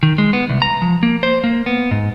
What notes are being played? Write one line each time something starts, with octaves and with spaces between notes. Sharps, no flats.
D#3
G#3
B3
C2
A#5
F3
A#3
C5
A#3
B3
G#2